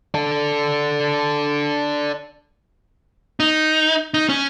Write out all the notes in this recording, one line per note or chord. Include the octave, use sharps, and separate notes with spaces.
D4 A4
D#4
D#4
C#4